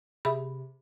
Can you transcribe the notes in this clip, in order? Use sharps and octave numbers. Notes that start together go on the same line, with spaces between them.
C3 G#4 E5 B5